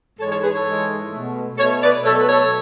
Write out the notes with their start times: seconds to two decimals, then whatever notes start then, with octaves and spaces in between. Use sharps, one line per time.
0.18 G#2 E3 G#3 A4 C#5
0.29 A4 C#5
0.41 G#4 B4
0.53 A4 C#5
0.65 G#2 E3 G#3
1.11 B2 A3
1.57 B2 A4 C#5
1.62 A3
1.81 B4 D5
2.04 B2 F#3 A3 A4 C#5
2.17 B4
2.27 A4 C#5